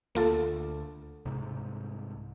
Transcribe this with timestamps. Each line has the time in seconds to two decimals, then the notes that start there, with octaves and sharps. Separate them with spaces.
0.15 D2 A#3 F4 A4
1.25 C2 G#2 C3